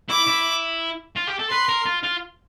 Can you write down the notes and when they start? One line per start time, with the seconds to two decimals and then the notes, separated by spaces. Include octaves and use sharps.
0.09 E4 D6
0.28 E4
1.16 F4
1.27 G4
1.39 A4
1.50 B4 C6
1.68 A#4
1.86 F4
2.03 F4